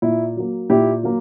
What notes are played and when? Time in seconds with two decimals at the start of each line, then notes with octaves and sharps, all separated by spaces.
0.02 A#2 E4
0.36 F#3 A#3
0.70 A#2 E4 G4
1.03 F#3 A#3